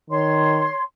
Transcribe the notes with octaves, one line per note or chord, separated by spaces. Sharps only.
D#3 C#5 C6